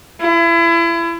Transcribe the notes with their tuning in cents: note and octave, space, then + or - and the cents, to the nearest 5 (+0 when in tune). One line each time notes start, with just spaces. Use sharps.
E4 +30